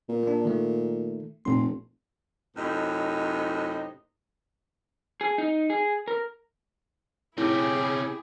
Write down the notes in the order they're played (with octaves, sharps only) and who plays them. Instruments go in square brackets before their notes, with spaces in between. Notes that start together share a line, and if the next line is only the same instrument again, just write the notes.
[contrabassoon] A#2
[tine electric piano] A#3 D4
D#3 A3
[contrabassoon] F1 [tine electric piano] A#2 C6
[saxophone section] F#2 A2 C3 D#4 D#5
[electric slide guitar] G#4
D#4
G#4
A#4
[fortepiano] A2 [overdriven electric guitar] C3 C#4 [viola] E4 G#4 [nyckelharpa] G4